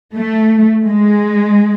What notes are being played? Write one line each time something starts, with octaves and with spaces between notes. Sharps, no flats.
A3
G#3